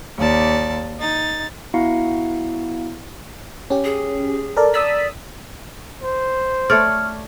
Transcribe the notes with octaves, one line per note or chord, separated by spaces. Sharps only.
D#2 D5 A5
D#4 A6
B3 E4 F#4 F5 A#5 C#7
C#4 G4
G#4
A4 A#4 D5
D5 D#6 E6 B6
C5
A3 C#5 D5 F6